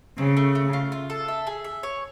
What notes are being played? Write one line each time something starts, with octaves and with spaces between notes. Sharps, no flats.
C#3 C4
A3
A3
F4
F4
A4
E5
G#4
E5
C#5